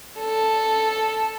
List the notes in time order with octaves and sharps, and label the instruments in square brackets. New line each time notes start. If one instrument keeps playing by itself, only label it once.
[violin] A4